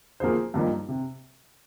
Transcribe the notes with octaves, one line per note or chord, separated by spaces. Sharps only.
F3 A#3 F4 G#4 C5
G2 F3 A#3 D#4
C3